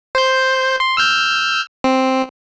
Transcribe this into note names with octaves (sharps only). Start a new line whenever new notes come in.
C5 G6
C6
E6 F6 G6
C4